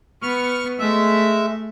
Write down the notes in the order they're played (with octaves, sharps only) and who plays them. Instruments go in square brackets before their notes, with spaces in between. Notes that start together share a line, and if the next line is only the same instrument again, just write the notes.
[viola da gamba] B3 [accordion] C#6 F6
[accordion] G#3 E5 [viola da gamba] A3